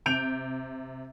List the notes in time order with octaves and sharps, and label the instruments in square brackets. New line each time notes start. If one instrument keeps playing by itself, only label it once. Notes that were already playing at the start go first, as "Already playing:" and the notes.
[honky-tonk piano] C3 G6 D7 F7